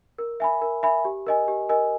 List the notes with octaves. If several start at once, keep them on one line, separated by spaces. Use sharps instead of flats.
A#4
E5 G#5 B5
A#4
E5 G#5 B5
G4
A#4 D#5 G#5
G4
A#4 D#5 G#5